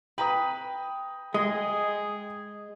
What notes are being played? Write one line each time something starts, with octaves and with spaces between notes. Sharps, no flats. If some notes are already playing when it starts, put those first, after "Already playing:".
B4 G5 A#5 D#6
G#3 G#4 D#5